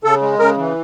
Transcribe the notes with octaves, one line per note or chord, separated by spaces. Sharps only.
C#3 A4
G#3
C#3 A#4
E3